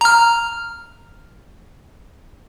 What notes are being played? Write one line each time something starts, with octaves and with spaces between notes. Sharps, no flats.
A#5 F6